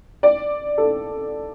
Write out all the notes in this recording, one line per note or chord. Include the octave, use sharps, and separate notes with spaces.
D5
A4